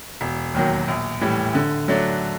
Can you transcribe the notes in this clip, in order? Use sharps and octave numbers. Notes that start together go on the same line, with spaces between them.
E1
D#2 D#3 F#3
A#1
A2 E3 G3
D3
F#3 A3 D4